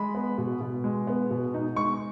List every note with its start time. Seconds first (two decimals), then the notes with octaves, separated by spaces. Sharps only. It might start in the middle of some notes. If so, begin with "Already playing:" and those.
Already playing: G#3 B5
0.15 B3
0.38 B2
0.61 B2
0.84 G#3
1.07 B3
1.31 B2
1.54 D#4
1.76 G#3 C#6